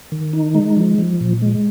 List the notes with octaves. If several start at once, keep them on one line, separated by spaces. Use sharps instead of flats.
D#3
D#4
G#3
F3
F3
A#2
G#3